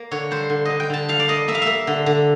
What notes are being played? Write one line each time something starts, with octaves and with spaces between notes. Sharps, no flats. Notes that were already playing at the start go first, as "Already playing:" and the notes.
Already playing: A#3
D3 C#5
G3 C5
D3
D3 D#5
G5
D3 A5
G3 F5
D5
A#3 D#5
A#3 E5
F5
E5
A#3
D3
D3